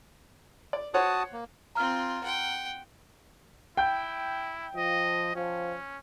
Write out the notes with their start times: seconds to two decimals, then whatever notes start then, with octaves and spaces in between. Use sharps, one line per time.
0.73 D5
0.94 F#4 C5 C#5 F#5 A5 D#6
1.33 A#3
1.75 C4 F4 A#5 F6
2.24 F#5 G5
3.77 E4 G5 G6
4.75 F3 D#5
5.36 F3 C#4